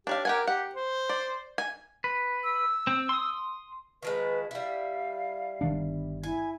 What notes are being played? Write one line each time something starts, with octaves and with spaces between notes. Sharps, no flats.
D4 G4 C#5 F5
G4 A#4 F#5 G#5
G4 F#5
C5
D5
G#5
B4
E6
C4
C6 D#6
D#3 F3 G#3 B4
G3 E4 F5
G1 D#3 D4
E4 G#5